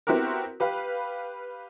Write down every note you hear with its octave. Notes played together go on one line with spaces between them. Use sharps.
B3 C4 E4 F#4 G4 A#4
G4 B4 F5 B5